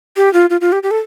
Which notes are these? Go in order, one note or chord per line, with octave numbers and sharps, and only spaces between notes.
G4
F4
F4
F4
G4
G4
A4